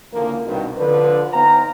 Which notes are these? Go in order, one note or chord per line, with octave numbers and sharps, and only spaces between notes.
C#2 D3 E3 F3 A#3
C2 G2 B2 D#3
D3 F3 D4 B4
B3 D#4 C5 F5 G5 A#5